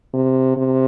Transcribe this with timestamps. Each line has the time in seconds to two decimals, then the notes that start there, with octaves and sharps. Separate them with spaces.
0.14 C3
0.57 C3